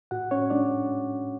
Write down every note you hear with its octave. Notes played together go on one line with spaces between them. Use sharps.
A2 F#4 F#5
C#4 C#5
G#3 D4 D5